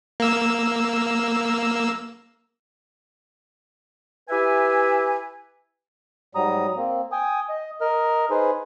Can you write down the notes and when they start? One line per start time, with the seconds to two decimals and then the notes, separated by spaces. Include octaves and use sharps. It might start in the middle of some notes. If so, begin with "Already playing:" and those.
0.20 A#3 E6
4.29 E4 G4 B4 E5 G#5
6.35 G#2 F#3 G3 A#5 D#6
6.76 A#3 C4
7.12 G5 G#5 D#6
7.49 D#5
7.81 A#4 D#5 F6
8.30 D#4 G#4 B4 C5